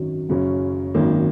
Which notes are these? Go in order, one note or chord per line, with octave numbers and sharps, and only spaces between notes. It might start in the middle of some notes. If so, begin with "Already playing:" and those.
Already playing: G#1 F#2 D#3 F#3
F#1 F#2 C#3 F#3 C#4
G#1 F#2 D#3 A#3